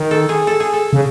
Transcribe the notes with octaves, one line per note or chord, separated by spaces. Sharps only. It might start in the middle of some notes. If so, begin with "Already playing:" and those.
Already playing: D#3
A4
G#4
A4
G#4
A4
C#3